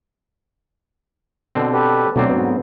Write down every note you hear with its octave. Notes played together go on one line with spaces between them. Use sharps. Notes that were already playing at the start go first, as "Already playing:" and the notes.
B2 D3 C4
G4 A4 B4
D2 B2 F#3 C4 D5
G#2 B3